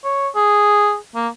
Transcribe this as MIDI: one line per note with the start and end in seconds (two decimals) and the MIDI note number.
0.04 0.28 73
0.36 0.96 68
1.15 1.28 58